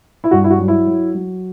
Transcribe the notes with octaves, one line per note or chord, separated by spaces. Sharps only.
E4
G2 F#4
E4
F#4
F#3
E4
F#3
F#3